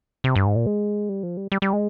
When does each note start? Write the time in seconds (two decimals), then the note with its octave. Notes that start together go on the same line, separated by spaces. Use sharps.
0.24 C3
0.36 G2
0.46 G#2
0.56 A#2
0.66 G#3
1.09 G3
1.23 F3
1.37 G3
1.52 G3
1.62 G3
1.73 G#3